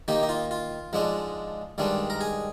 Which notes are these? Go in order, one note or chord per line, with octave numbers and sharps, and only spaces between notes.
D#3 A#3 D#4 G4
D#4
F4
F4
G#2 F3 G#3 D4
G2 D#3 G#3 D4
A#4
G#4